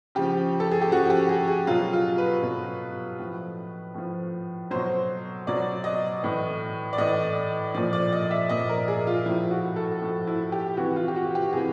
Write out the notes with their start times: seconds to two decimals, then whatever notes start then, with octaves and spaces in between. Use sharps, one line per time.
0.15 C#3 F3 G4
0.60 A4
0.71 G#4
0.81 G4
0.91 C#3 F3 F#4
1.10 G4
1.29 G#4
1.48 G#4
1.67 B2 F#3 F4
1.93 F4
2.18 B4
2.43 B2 F#3
3.19 A2 F3
3.94 A2 F3
4.71 B2 F#3 C5
5.47 B2 F#3 D5
5.84 D#5
6.23 A2 E3
6.93 D5
6.98 A2 E3 D#5
7.74 A#2 F3 D5
7.93 D5
8.13 D#5
8.31 E5
8.49 A#2 F3 D#5
8.69 A#4
8.88 G#4
9.07 F4
9.26 A2 F3 E4
9.51 F#4
9.76 A4
10.01 A2 F3
10.27 E4
10.52 G4
10.77 C3 E3 F#4
10.96 F4
11.08 G4
11.16 F#4
11.35 G4
11.53 C3 E3 G#4